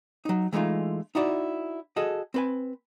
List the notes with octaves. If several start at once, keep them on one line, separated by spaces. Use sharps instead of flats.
F#3 D#4
E3 G#3 A3 D#4 F4
D#4 E4 F#4 D5
F#4 G#4 A4 D#5
C4 B4 G#5